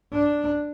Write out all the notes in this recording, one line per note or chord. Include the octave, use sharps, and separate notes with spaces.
D4